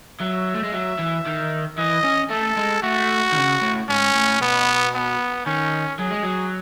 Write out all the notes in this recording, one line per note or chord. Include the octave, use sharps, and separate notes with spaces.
F#3 E5
A3
G#3
F#3 E5
E3
D#3
E3 D#5
C#4
A3 A4
G#3
A3 F#4
D#3
C#3
A2
G#2 C#4
A2
B2 B3
B3
D#3 C#4
F#3 G#4
G#3
F#3